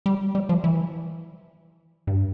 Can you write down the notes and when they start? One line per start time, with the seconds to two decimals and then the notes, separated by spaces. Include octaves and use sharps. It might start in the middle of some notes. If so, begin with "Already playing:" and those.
0.06 G3
0.35 G3
0.49 F3
0.64 E3
2.07 G2